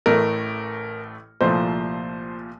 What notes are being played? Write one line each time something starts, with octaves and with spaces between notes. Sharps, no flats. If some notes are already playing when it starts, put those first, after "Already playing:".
A1 A2 A3 A#4
C2 A#2 F3 A3 C5